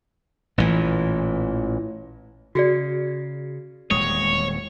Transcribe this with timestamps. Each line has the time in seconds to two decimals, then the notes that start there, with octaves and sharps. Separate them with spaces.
0.58 A1 A#2 C#3 E3
2.55 C#3 F#4 G#4 D5
3.91 D#1 E2 G#3 C#5 D#6